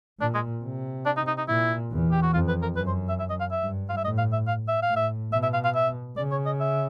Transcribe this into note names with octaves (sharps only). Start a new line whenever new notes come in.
A#2 D4
G#3
C3
D4
D#4
D#4
D#4
A#2 E4
E2
G4
F#4
F2 F4
B4
A#4
F#2 B4
C5
E5
E5
D#5
F5
E5
G2
F5
E5
A2 D#5
F5
E5
F5
E5
F5
A2
E5
B2 E5
E5
F5
F5
E5
C#3 D5
C#5
D#5
E5